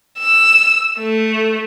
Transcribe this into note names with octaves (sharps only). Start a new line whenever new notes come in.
E6
A3